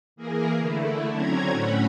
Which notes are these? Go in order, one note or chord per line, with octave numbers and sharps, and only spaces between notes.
E3 A#3 G#4 A#4
D3 A3 E4
D3 F#3 C4 C#4 A#5 G#6
A2 A3 C#4 F#5 B5